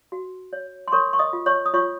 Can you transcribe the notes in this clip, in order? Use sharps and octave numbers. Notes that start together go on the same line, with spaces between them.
F#4
C#5
C6
A#4 C#5 C#6
C#6
D#5 D#6
F4
C#5 C#6
D#6
F4 C#5 C#6